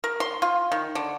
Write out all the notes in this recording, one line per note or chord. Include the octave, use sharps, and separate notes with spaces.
A#4
C6
F4
D#3
D3